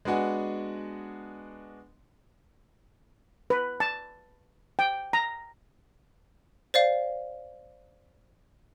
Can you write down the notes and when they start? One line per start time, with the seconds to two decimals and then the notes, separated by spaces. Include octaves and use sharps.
0.05 G#3 B3 D4 F#4 F#5 G#5
3.50 B4
3.80 A5
4.79 G5
5.13 A#5
6.74 C5 D5 F5